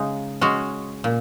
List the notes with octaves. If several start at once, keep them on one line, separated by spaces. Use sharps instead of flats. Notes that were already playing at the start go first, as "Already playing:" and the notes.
Already playing: C#3 G#3 D#4
G#3 C#4 F#4
A#2